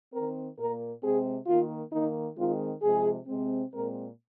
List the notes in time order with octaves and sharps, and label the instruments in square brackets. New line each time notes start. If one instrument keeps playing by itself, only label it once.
[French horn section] D#3 C4 A#4
A#2 A#3 A#4
C3 G#3 C4 G#4
D#3 A#3 F4
D#3 A#3 D#4
D#3 G#3 C4 F4
C3 F3 G#3 G#4
C3 G#3 C4
A#2 G#3 C4 A#4